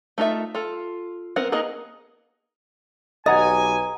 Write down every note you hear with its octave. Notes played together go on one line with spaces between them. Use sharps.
A3 D#4 F4 A4 E5
F4 A4
B3 C4 A#4 F#5
A#3 B3 D#4 G#4 D#5
B1 G4 D#5 F#5 G#5 A#5 D#6